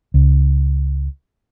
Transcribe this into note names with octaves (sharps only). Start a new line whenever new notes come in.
C#2